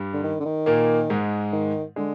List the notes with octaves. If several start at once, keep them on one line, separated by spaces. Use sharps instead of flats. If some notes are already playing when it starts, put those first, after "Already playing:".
Already playing: G2 G3
D3
D#3
D3
D#3
A#2 A#3
G#2 G#3
D#3
D3 G#3